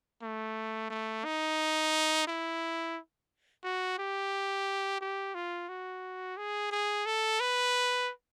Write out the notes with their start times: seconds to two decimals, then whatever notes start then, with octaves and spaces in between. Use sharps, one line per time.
0.22 A3
0.90 A3
1.25 D#4
2.27 E4
3.64 F#4
3.98 G4
5.01 G4
5.35 F4
5.69 F#4
6.37 G#4
6.71 G#4
7.06 A4
7.40 B4